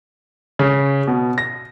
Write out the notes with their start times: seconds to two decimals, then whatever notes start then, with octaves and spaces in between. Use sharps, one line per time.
0.59 C#3
1.07 B2
1.38 A#6